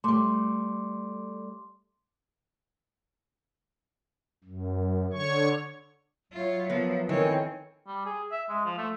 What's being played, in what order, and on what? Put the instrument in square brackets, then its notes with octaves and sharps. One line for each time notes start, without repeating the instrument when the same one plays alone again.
[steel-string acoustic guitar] G3 A3 [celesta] C6 D6
[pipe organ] F#2
D3 C#5 C#6
[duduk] F#3 [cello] F4 C#5 [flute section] E5
[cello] F3 [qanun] B3 A#4
[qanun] D#3 A4 [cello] C4 C#5 [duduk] E4 [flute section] A#4 G5 G#5
[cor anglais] G3
G#4
E5
G#3
F3
A3